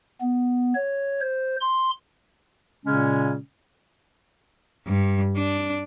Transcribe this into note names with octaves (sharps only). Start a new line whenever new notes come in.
B3
C#5
C5
C6
A#2 C#3 G#3 C#4
G2
D4